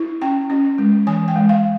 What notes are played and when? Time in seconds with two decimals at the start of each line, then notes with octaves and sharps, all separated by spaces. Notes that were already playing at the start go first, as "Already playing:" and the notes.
Already playing: E4
0.22 C#4 G5
0.50 C#4
0.78 G#3
1.07 E3 G#5
1.28 G5
1.36 G#3
1.49 F5